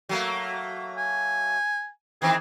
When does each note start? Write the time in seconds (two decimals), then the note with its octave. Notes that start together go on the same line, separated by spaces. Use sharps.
0.09 F#3 A3 A#3
0.97 G#5
2.22 D#3 E3 C4 G#4